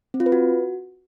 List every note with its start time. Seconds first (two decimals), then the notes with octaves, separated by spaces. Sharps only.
0.14 C4
0.20 F4
0.26 B4
0.32 F#4